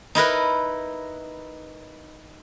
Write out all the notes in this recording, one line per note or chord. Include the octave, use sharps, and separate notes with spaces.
D#4 E4 A#4 B4